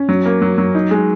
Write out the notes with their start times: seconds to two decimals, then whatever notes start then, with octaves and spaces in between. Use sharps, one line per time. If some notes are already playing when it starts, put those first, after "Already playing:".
Already playing: C#4
0.09 F#3
0.26 A#3
0.42 F#3
0.58 F#3
0.75 D#4
0.91 G#3